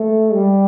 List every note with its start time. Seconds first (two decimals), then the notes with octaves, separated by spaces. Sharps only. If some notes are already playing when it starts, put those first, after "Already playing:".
Already playing: A3
0.33 G3